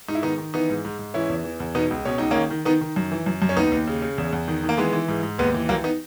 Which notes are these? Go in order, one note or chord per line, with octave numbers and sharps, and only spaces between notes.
G#2 D#4
E4
D#3 B3 D#4
D#3
E3 B3 D#4
G#2
G#2
G#2
E3 C#4 E4
E2
E3
E2
B2 B3 D#4
C#2
B2 C#4
C#2 D#4
D#3 A#3 C#4
D#3
D#3 B3 D#4
D#3
F#2
E3
F#2
F#2
C#4
D#2 B3 D#4
D#2
C#3
C#3
E2
E2
D#3
D#3
A#3
E3 G#3 B3
E3
G#2
G#2
D#2 G#3 B3
E3
D#2 F#3 A#3
B3 D#4